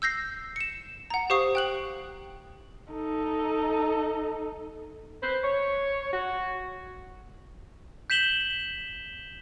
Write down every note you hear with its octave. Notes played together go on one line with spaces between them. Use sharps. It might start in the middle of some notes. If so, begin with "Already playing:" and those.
E6 G6 A#6 C7
C#7 E7
F#5 A#5
G4 C5 F5 C#6 D#6 C7
G5 F#6 F#7
D#4 A4
B4 C5
C#5
F#4
G6 B6 E7 F#7 G7